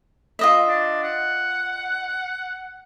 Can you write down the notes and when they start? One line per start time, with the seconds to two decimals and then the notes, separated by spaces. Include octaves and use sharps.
0.39 F4 D#5 E5
0.68 D4
1.03 F#5